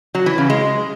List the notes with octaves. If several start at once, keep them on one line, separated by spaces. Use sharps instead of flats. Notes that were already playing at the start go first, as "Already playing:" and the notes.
F#3
E3
C#3
G#3